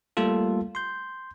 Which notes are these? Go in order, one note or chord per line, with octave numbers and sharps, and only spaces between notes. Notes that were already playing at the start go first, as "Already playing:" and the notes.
G3 A3 A#3 F4 A4
C6 G6